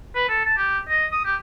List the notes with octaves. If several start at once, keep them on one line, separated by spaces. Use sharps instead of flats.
B4
A4
A5
G4
D#5
D#6
G4